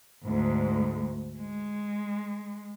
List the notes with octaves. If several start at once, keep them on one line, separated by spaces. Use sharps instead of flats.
D2 G#2
G#3